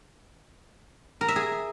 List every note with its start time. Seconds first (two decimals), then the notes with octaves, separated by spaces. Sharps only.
1.21 A#4
1.28 E5
1.36 G#4